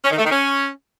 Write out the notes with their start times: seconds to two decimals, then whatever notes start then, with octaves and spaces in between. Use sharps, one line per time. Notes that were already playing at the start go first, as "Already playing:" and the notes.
0.04 C#4
0.10 D#3
0.17 A3
0.24 D#3
0.30 C#4